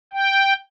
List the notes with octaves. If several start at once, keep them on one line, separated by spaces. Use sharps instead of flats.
G5